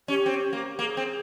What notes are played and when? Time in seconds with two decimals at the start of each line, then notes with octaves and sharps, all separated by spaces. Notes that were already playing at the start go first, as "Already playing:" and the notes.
0.08 C#4 G4
0.26 C4
0.53 A#3
0.79 A#3 G#4
0.97 C4